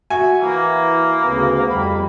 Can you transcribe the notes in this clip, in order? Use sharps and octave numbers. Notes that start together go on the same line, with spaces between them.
F#4 E5 G#5
E3 A#3 E4
D2 C#3 B3
F2 G3 B5